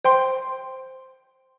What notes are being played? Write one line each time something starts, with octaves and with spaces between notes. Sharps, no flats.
C5 G5 C6